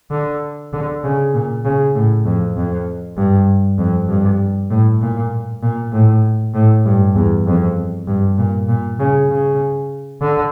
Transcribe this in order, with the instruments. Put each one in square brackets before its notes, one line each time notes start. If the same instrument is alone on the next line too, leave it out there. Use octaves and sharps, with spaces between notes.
[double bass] D3
D3
C#3
A#2
C#3
A2
F2
F2
G2
F2
G2
A2
A#2
A#2
A2
A2
G2
E2
F2
G2
A#2
A#2
C#3
C#3
D3